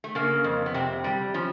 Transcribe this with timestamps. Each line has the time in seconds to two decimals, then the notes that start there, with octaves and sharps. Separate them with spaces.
0.04 A3
0.15 C#3 A#3
0.44 F2
0.66 B3
0.74 C3 C4
1.04 G3
1.34 F3 C#4